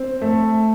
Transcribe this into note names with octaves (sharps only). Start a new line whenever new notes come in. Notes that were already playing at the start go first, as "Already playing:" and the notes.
Already playing: C4
A3